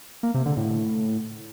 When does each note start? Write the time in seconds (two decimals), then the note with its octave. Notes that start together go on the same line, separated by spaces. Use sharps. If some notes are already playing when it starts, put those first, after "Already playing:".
0.23 A#3
0.34 C3
0.46 D3
0.57 A2